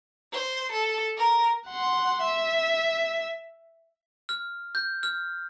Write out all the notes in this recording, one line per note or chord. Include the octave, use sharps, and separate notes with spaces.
C5
A4
A#4
F#5 C6
E5
F6
G6
F6